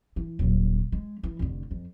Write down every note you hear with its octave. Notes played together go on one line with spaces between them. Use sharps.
E3
D#1 F#3
G#3
E3
F1 D3
F2